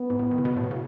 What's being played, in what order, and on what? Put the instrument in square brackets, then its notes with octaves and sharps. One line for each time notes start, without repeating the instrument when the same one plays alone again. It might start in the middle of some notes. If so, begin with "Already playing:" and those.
Already playing: [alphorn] B3
[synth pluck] G#2
A2
D#3
C#3
B2
A2
B2
C#3